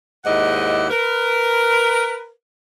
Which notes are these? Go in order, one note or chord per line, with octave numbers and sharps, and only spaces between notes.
D#2 G#2 E4 D5 D#5 F#5
A#4 B4